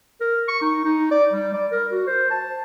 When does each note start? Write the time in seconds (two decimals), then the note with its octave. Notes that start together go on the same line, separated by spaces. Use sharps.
0.21 A#4
0.48 C#6
0.61 D#4
0.85 D#4
1.11 D5
1.33 G3
1.54 D5
1.72 A#4
1.92 F#4
2.07 C5
2.30 A5